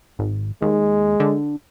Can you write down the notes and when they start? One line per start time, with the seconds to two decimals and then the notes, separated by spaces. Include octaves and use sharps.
0.19 G#1
0.62 D#2 G#3
1.20 D3